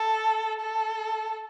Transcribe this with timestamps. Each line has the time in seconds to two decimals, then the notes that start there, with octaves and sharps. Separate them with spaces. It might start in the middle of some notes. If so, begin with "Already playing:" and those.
Already playing: A4
0.61 A4